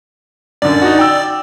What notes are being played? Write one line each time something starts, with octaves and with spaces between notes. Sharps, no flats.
F#2 D3 D5
D#4 F#4
G5 E6